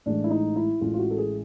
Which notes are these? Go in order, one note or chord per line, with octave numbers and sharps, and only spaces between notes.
A1 A2 E3 G#3 D4
E4
D#4
E4
A1 A2 E3 G#3 F4
F4
F#4
A4
G#4